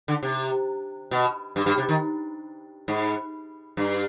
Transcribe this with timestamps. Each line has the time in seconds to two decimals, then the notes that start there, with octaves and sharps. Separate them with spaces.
0.08 D3
0.23 C3
1.11 B2
1.56 G2
1.66 G2
1.78 C3
1.89 D#3
2.88 G#2
3.77 G2